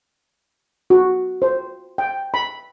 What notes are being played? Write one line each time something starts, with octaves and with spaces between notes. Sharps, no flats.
F#4
C5
G5
B5